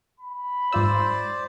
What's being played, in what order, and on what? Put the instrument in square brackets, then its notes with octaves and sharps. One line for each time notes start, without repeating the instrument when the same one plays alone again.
[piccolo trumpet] B5
[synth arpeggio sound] G#2 F4 E6 [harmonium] C5 D5